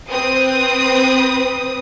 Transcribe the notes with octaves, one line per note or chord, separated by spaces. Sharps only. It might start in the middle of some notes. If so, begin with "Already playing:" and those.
C4 B4 D#6